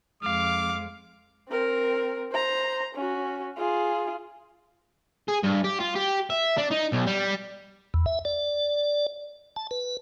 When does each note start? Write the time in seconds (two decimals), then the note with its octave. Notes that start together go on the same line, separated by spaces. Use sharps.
0.23 F2 G#3 F5 D6
1.49 C4 A#4
2.32 C5 A#5
2.95 C#4 F#4
3.57 F4 G#4
5.29 G#4
5.44 G2
5.65 G4
5.80 F4
5.96 G4
6.30 E5
6.57 D4
6.71 D#4
6.92 B1
7.06 G3
7.94 E2
8.06 E5
8.25 D5
9.56 A5
9.71 B4